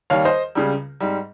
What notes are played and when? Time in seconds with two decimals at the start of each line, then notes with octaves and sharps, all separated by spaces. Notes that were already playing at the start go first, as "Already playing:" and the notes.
0.10 D#2 D#3 G3 C#5 F5
0.25 C5 D#5
0.55 C#2 C#3 G3
1.00 G#2 G3